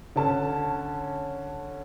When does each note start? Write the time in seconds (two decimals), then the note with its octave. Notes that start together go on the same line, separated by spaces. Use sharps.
0.16 D3 C#4 A5